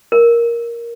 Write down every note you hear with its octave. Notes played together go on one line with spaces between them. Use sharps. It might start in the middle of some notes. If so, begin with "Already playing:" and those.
A#4